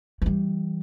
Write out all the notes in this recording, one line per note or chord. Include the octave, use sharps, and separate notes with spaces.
E3 G3